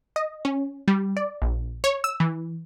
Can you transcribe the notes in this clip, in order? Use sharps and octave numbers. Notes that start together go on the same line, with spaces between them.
D#5
C#4
G3
D5
A#1
C#5
E6
E3